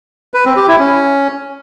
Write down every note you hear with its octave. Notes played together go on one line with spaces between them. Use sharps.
B4
C4
G4
E4
C#4